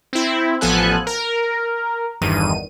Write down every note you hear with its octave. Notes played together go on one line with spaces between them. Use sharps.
C4 E4
A1 F3 B3 A4 G#5 F#6
A#4
G1 E2 G2 D#3 D#7